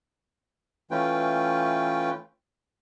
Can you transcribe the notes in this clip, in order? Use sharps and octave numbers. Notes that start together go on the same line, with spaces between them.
E3 A3 C#4 F4 B4 G5